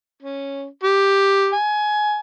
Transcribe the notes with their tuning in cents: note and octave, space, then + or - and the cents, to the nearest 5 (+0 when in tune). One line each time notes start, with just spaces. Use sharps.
C#4 -5
G4 +5
G#5 +20